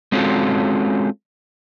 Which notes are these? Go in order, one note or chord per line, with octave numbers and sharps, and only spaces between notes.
G#3 C4 C#4 F4 F#4 A4